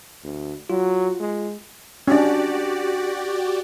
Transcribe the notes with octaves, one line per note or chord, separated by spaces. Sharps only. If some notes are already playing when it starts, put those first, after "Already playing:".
D2
F#3 F4
G#3
C#4 D4 F#4 G4 D5